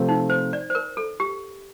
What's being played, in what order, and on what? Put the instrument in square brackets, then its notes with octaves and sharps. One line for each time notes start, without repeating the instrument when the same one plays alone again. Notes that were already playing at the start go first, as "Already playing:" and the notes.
Already playing: [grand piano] C3 F3 A3 C4
[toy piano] D#4
C5
D5
C5
A#4
A4
G4